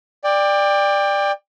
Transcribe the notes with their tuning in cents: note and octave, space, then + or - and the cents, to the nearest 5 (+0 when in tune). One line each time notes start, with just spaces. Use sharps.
D5 +10 G5 +25